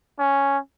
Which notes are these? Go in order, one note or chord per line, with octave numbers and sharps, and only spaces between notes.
C#4